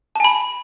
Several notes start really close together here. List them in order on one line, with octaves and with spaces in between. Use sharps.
A5 G#5 B5